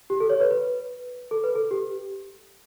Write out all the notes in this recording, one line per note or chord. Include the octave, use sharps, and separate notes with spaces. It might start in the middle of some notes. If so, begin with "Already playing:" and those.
G4
A4
C#5
B4
B4
A4
B4
A4
G4